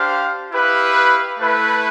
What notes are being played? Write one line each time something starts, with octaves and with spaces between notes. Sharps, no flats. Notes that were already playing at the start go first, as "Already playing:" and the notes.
Already playing: D4 G4 C5 F5
E4 G4 B4 F5
A3 E4 B4